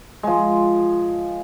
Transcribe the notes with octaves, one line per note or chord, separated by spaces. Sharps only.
F3 G#3